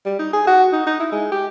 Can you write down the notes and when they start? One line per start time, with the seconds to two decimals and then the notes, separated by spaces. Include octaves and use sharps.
0.06 G3
0.19 D#4
0.33 G#4
0.47 F#4
0.73 D#4
0.87 D#4
1.00 E4
1.12 G#3
1.32 G4